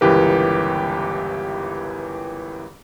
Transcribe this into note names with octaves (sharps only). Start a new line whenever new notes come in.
G1 C#2 E3 G4 A#4 B4